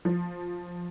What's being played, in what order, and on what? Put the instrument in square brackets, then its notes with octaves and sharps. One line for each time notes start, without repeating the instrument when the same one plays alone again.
[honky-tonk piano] F3